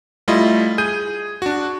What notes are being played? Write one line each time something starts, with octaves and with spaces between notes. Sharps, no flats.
G3 A3 E4 F4 D#5
G#4 G6 D#7
D4 F#4